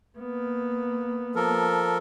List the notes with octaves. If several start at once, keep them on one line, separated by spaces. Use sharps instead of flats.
A#3 B3
F3 A4 A#4